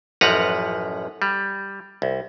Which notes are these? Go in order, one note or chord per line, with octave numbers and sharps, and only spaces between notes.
A1 F#2 F3 B4 F#5 A#5
G3
C2